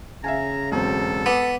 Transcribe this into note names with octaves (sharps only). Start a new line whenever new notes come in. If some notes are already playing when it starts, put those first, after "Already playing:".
C#3 E5 F5 G#5 A#5
E1 F#3 C4 A4
B3 D6